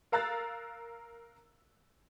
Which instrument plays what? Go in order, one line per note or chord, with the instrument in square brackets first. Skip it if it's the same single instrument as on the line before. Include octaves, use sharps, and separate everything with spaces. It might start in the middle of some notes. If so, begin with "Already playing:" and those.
[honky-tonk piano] A#4 F5 A#5 E6 F#6 A6